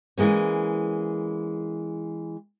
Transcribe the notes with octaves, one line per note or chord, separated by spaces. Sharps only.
E3 G#3 A#3 C#4